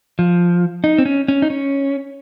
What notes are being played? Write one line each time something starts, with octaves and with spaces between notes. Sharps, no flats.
F3
D#4
C4
C#4
C#4
D#4
C#4